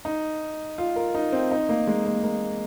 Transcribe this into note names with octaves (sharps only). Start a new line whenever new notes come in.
D#4
F4
A#4
D#4
C4
D#4
A#3
G#3
A#3
A#3